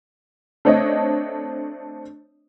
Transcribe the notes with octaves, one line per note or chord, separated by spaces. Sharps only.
A3 C4 D4 C#5 D#5